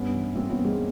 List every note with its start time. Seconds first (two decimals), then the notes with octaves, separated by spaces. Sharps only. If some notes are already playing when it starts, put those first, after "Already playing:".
Already playing: G2 B3 C#4
0.14 E3
0.35 G2 A#3 C4
0.49 B3 C#4
0.57 E3
0.64 G#3 A#3